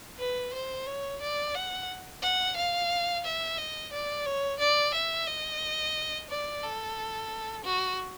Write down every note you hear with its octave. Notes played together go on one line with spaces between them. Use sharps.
B4
C5
C#5
D5
F#5
F#5
F5
E5
D#5
D5
C#5
D5
E5
D#5
D5
A4
F#4